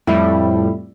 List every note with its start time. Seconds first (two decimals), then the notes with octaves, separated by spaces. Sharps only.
0.07 F2 A2 G3 E4